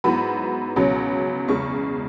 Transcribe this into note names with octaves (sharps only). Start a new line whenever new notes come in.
G#2 F#3 B3 E4 B5
C#2 B2 F#3 C#4
E2 C#3 G#3 C#6